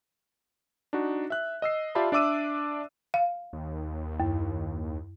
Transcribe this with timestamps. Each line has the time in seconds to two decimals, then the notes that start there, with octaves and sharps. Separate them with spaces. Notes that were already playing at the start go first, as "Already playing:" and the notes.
0.93 D4 D#4 F#4
1.30 E5 F#6
1.62 D#5 E6 C7
1.95 F4 G4 D5 E5 A5 B5
2.12 D4 D5 E5 D6 E6 D#7
3.14 F5
3.53 D#2
4.20 F#2